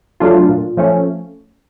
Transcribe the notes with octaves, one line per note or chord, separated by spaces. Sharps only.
F#3 A3 D4 F4
A#2
F3 A3 C#4